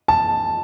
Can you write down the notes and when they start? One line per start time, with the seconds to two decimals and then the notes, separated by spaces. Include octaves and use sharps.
0.08 A5